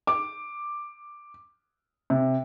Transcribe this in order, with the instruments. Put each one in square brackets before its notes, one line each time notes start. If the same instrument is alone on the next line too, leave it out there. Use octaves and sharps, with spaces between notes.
[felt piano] D6
C3